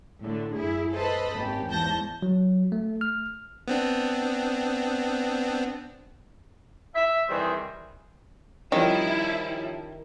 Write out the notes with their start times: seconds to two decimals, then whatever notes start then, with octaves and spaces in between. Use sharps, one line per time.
0.23 A2 D3
0.57 F#2 E4 G#4
0.95 A4 B4 C5 D#5 A5 B5
1.36 G#1 A#3 C#4 G4
1.68 E2 G#2 A5 G6 A#6
2.22 F#3
2.72 A3
3.01 F6
3.68 B3 C4 D4
6.95 E5
7.29 C3 D#3 E3 G3 G#4 C5
8.72 D#3 F3 G3 C#4 E4